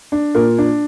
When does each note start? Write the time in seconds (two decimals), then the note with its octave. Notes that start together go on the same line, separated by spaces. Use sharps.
0.12 D4
0.35 A#2 A#4
0.58 D4